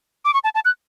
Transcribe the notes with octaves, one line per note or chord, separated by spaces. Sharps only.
D6
C#6
A5
A5
F#6